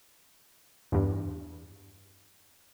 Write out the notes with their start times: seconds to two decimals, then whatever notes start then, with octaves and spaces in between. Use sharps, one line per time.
0.92 E2 G2